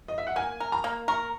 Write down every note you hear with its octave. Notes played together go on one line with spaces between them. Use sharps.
D#5
E5
F#5
A#3 G#5
A#4
A#5
A#3
A#4 C#6